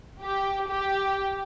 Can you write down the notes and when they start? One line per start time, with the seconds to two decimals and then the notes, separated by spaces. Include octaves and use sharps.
0.22 G4
0.68 G4